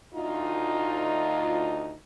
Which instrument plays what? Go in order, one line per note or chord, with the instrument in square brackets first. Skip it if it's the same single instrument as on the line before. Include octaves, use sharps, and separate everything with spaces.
[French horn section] D2 D#4 F4